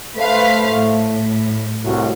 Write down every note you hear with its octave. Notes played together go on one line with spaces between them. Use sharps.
A3 B4 C5 F5
A2
C2 A2 F#4